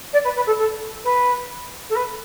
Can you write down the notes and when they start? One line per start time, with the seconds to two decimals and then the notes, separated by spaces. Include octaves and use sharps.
0.13 D5
0.24 B4
0.35 B4
0.46 A4
0.58 A4
1.04 B4
1.89 A4
1.95 B4